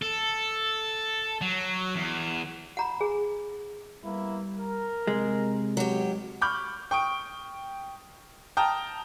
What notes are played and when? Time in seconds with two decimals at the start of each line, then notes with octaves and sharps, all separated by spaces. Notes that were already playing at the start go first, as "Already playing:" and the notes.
0.02 A4
1.41 F#3
1.95 E2
2.77 F#5 A#5 B5
3.00 G#4 G#5
4.04 G3 A#3 B3 E4
4.59 A#4
5.07 C3 G#3
5.77 B1 F#3 G4
6.41 B5 C#6 D6 F6 G6
6.91 G5 C#6 D#6 D7
8.57 G5 A5 A#5 D#6 F6